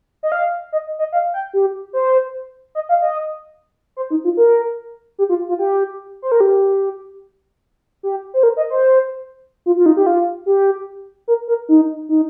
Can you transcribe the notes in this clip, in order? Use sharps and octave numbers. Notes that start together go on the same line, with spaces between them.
D#5
F5
D#5
D#5
F5
G5
G4
C5
D#5
F5
D#5
C5
D#4
F4
A#4
G4
F4
F4
G4
C5
A#4
G4
G4
C5
A#4
D#5
C5
F4
F4
D#4
G4
F4
G4
A#4
A#4
D#4
D#4